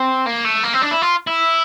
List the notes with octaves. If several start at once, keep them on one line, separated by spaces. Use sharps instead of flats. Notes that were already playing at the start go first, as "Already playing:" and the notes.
Already playing: C4
A#3
A3
A#3
C4
D4
E4
F4
E4